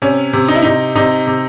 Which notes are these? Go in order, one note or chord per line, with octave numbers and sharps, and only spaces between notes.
C3 C#4
C3
D#4
E4
C3 D#4
C3 D#4
C3